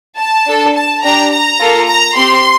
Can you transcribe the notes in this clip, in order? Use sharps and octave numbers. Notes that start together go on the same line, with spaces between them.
A5
D4 A4
A5
D4 G4 A#5
A#5
A#3 F4 A4
A#5
C4 G4 C6